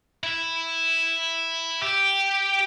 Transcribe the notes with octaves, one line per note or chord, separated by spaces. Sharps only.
E4
G4